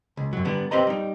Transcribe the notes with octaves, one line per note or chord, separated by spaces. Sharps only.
C#2
F#2 F#3
D3 G3 B3 D4
C4 G4 B4 C5 D#5 A#5
G3 D#4